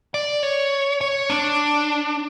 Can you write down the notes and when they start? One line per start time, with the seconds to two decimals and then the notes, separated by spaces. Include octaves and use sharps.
0.14 D5
0.43 C#5
1.01 C#5
1.30 D4